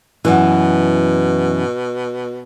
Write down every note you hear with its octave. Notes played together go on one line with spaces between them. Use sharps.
F#2 B2 E3